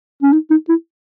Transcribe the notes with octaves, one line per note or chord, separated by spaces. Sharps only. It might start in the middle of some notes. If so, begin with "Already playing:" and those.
C#4
D#4
D#4
E4